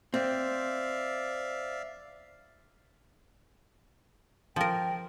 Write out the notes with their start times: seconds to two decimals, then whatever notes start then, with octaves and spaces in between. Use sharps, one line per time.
0.14 C4 D5 E5 F5
4.56 F3 A#4 G5